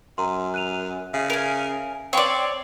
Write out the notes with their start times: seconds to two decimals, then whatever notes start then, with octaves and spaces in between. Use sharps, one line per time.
0.18 F#2 A#5 C6
0.54 F#6 D#7 F7
1.14 C#3 E5
1.30 A#4 G#5
2.13 C4 C#5 D5 F5 G5 C6